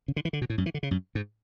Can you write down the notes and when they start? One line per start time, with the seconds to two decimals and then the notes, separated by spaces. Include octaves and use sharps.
0.08 C#3
0.16 D3
0.25 E3
0.33 D3
0.42 B2
0.50 A2
0.58 F#2
0.66 E3
0.74 D3
0.83 C#3
0.91 F#2
1.15 G#2